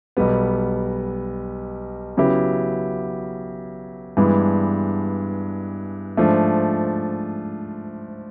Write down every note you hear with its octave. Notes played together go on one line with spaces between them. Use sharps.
B1 B2 G3 B3
C#3 F#3 B3 E4 G4
G2 E3 G#3 B3 D4
G#2 F3 A3 D4